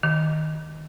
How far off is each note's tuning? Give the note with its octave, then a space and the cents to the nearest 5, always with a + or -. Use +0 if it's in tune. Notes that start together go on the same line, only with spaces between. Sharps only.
D#3 -5